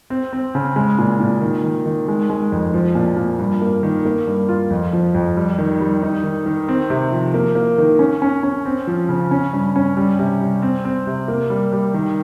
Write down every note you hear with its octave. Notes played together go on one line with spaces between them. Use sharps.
C4
C4
C#3
G#3
A#2
A#2
D#3
D#3
D#3
G#3
G#3
F2
F3
A#2
A#2
G2
A#3
D#3
A#3
G2
F4
F2
F3
F2
G3
D#3
G3
D#4
D#3
D#3
C4
C3
F3
A#3
A#3
D#3
C#4
C#4
C#4
C4
F3
C#3
C#4
G2
C#4
G3
C3
G3
C4
C4
C3
A#3
G3
G3
D#3